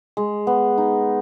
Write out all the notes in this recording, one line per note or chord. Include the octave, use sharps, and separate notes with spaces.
G#3
B3
D#4